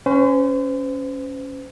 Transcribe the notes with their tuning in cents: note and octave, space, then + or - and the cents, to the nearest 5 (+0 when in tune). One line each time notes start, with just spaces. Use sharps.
C#4 +0 C5 -40